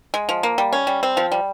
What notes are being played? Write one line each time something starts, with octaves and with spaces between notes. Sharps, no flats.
G#3
F3
A#3
G3
C#4
G3
C4
F3
G3